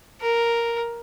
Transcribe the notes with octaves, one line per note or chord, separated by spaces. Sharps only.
A#4